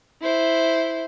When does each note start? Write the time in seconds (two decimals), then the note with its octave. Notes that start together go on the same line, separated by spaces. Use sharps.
0.22 E4 C5